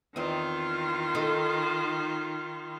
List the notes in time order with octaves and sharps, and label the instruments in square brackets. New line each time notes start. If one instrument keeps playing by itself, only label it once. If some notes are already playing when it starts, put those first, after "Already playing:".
[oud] E2 C4 D#5 [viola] D#3 F4
[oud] D#4 A4